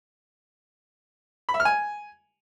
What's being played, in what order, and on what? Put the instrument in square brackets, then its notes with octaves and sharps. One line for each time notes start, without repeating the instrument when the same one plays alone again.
[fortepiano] B5
E5
F6
G#5